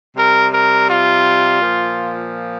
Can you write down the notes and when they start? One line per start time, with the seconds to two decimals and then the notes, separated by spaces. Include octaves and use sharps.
0.15 C3 G3 A#4
0.51 A#4
0.87 F4
1.58 A#2 F3